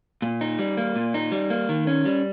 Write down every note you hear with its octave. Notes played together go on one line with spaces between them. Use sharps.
A#2
D#4
G3
A#3
A#2
D#4
G3
A#3
D#3
C#4
G3